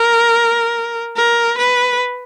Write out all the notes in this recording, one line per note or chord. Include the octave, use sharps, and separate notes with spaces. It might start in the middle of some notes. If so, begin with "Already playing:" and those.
Already playing: A#4
A#4
B4